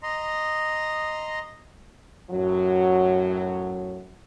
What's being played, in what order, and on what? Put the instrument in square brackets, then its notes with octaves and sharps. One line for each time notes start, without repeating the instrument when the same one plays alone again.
[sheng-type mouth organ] D#5 A#5 C6
[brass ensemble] F#2 A2 F#3